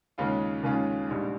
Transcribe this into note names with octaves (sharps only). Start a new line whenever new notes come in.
D#2 C#3 G#3 C#4 F4
D#2 C#3 G#3 C#4 F4
A#1 G#2 G3